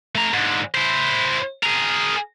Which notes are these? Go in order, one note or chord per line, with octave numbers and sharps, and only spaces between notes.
A3 A#5
G#2 D3
E4 C5
G#4 A#4